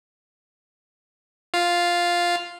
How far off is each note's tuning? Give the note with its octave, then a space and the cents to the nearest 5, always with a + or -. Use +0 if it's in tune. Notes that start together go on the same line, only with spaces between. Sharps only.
F4 +0 F5 +0